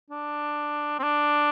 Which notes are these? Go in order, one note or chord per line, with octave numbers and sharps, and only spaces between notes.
D4
C4
D4